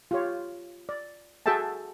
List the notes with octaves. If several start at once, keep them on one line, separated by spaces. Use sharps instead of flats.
F4 G4 C#5
D5
F#4 G#4 A4 E5 G5 A5